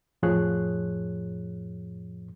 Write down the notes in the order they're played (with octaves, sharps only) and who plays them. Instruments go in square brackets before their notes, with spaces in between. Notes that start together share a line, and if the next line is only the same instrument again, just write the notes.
[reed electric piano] F2 A2 F3 G#4 C#5 F#6